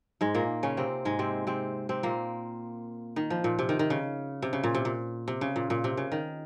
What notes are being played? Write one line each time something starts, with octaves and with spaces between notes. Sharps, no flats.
G#2 G#3
A#2 A#3
C#3 C#4
C3 C4
G#2 G#3
C3 C4
C3 C4
C3 C4
A#2 A#3
D#3
F3
A#2
C3
D#3
D#3
C#3
C3
C#3
A#2
C3
A#2
C3
C#3
A#2
A#2
C3
C#3
D#3